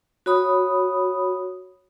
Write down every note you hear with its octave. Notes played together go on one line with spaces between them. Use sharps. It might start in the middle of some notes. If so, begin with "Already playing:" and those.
F#4 C#5 B5 D#6